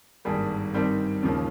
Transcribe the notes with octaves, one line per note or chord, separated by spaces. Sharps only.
G#1 G2 G3 A#3 G#4
G2 D#3 G3 C4
D#2 C#3 F3 A#3